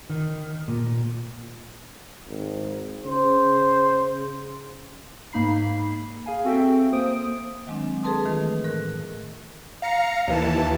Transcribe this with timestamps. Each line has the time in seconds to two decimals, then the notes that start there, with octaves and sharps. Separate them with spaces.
0.10 D#3
0.68 A#2
2.28 G#1
3.06 C#3 C5
5.33 G#2 A#3 D#4 B5 C7
6.26 G#4 F5 G#5
6.45 C4 F#4 A4 E5 G5
6.92 A#3 C5 D#6 D7
7.67 D#3 F#3 G#3 C4 D4
8.03 G#4 A4 B4 A5 C6 D#6
8.25 D#3 E3 A3 F4
8.64 A2 A#4 F#6
9.82 F5 A#5 C#7
10.28 D#2 E3 A5